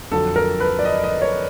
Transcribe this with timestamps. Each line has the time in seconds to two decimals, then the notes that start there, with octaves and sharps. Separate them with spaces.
0.11 F2 D3 F#3 A4
0.36 A#4
0.60 B4
0.79 D5
0.85 D#5
1.04 D#5
1.22 C#5